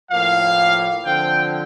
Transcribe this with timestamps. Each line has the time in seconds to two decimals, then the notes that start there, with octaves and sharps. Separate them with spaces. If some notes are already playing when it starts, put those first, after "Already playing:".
0.11 A2 F3 A#3 F5
1.04 D3 F3 C4 G5